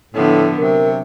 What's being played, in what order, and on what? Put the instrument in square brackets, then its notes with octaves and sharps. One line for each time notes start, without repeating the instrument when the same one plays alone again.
[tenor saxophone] A2 [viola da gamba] D3 F3 B3
[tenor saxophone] C3 [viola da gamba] F#3 [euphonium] A#4